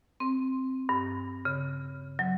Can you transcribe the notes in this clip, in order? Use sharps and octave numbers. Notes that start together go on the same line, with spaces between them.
C4
G2
C#3
F#3